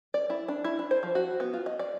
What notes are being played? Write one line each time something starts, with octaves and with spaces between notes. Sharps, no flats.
D5
E4
D4
E4
D4
C5
F3
F#4
B3
F4
D#5
D5